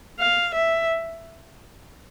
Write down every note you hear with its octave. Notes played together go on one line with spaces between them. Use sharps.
F5
E5